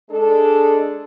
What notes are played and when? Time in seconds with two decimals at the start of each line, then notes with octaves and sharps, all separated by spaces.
0.10 G#3 D4 A4